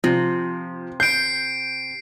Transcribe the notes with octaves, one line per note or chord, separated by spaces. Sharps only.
C3 F3
G6 C7 D7